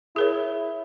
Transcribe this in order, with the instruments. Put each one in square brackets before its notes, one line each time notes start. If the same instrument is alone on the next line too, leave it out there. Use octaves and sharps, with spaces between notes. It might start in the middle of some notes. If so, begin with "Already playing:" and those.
[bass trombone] E4 [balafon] G#4 A#4 C#5